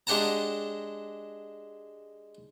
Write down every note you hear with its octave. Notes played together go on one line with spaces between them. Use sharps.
G#3 D4 G4 F#5 A5 A#5